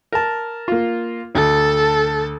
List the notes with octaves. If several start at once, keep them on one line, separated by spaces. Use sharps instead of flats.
A#4 A5
A#3 F4
D2 A4 A5